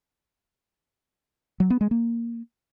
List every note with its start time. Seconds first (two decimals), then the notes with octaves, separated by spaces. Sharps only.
1.60 F#3
1.70 B3
1.81 G#3
1.91 A#3